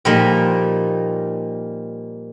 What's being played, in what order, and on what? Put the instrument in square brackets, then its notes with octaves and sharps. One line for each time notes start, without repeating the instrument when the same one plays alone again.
[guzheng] A#2 F3 G3 A#3 D#4